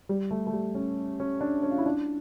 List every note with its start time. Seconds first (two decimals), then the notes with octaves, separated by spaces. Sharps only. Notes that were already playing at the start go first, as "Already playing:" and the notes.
0.09 G3
0.31 A3
0.47 A3
0.53 G3
0.75 C#4
1.20 C#4
1.41 D4
1.63 C#4
1.71 F4
1.78 E4
1.86 D4